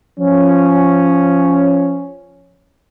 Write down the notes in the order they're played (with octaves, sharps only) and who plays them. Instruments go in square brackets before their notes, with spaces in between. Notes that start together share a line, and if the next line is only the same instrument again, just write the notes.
[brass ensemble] F3 C#4